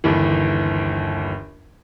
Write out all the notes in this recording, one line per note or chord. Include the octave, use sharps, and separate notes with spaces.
G1 D#2 E3